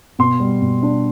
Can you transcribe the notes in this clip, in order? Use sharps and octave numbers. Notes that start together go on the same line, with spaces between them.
B2 C6
G3
B2
D4